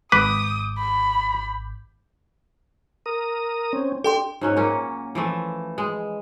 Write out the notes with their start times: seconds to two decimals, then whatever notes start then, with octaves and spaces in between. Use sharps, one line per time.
0.12 G#1 B4 D6 D#6 G6
0.78 B5
3.06 A#4 D#6
3.73 C4 C#4
4.04 D4 G4 A4 G5 C6
4.41 G#2 F#3 C#4
4.56 A#2 A#3 C#4
5.15 E3 F3 A3
5.78 G#3